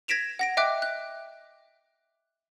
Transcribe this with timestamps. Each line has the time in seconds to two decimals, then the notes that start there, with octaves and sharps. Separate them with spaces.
0.08 G#6 A#6 B6 D7 E7 F7
0.39 F#5 A#6 D7
0.57 D#5 E5 G5 D6 F#6
0.82 F#6